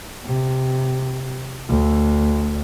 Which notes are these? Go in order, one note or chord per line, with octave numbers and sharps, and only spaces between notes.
C3
D2